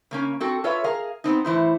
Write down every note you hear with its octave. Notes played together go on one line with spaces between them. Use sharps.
C#3 A#3 C#4
C4 F#4 A4
F4 A4 B4 C#5 E5
G#4 A#4 F5
B3 C4 D#4
A2 E3 E4 C5